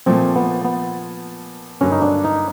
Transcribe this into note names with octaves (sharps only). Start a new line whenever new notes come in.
A#2 F3 A3 C4
B3
B3
G2 D3 F#3 A#3 C#4
D#4
D4
D#4